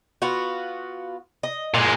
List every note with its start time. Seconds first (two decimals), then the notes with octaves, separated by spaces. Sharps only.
0.22 B3 F4 F#4
1.43 D#5
1.74 A#2 G#3